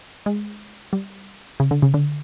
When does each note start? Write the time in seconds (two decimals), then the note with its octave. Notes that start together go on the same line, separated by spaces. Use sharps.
0.26 G#3
0.93 G3
1.60 C#3
1.71 D3
1.82 C#3
1.94 D3